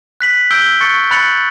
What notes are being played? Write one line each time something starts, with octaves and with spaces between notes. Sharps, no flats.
F#6 B6 F#7
E6 G6 D7 G7
C#6 F#6 A6 C#7
B5 F#6 A6 C#7 F#7